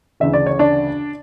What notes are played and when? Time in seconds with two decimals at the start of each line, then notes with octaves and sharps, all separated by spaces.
0.20 D2 C#3 E3 E5
0.34 D5
0.47 C#5
0.59 D4 D5